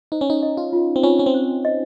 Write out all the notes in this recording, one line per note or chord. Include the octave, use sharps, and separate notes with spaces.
D#4 C5
C#4
D#4
D#5
F4
F4
C4
C#4 F4
C#4
C4
C5
D#5